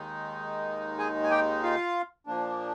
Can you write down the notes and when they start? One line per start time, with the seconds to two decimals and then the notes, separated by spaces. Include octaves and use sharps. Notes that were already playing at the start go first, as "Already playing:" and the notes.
Already playing: D#2 D#3 G#3 D#4
0.98 G#4 G#5
1.23 G#5
1.30 G4 G5
1.63 F4 F5
2.27 A#2 F3 A#3 D4